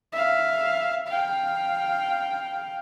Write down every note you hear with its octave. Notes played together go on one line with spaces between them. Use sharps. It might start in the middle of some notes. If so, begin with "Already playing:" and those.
E5 F5
F5 G5